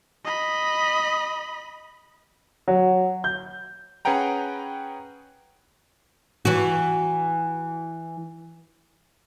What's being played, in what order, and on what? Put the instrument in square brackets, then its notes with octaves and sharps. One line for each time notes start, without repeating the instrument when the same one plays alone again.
[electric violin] D#5 B5
[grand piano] F#3
G6
[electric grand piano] C#4 G#4 B4 F#5 G5 A#5
[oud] E3 F#4